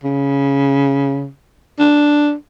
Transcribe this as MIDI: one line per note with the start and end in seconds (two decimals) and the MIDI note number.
0.04 1.28 49
1.79 2.33 62